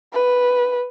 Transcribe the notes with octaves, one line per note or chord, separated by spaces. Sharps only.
B4